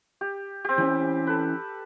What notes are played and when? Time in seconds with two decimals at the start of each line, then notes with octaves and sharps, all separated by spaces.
0.21 G4
0.65 C4 G4
0.78 E3 C#4
1.27 A4 B4